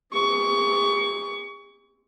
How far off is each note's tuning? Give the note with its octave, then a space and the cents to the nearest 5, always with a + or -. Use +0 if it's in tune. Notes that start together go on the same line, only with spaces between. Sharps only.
G#4 -45 C#6 +25